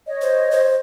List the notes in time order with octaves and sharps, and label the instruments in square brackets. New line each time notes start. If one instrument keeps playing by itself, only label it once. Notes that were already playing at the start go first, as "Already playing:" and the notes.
[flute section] C#5 D#5
[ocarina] C5
C5